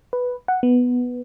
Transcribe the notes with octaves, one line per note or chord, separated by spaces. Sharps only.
B4
F#5
B3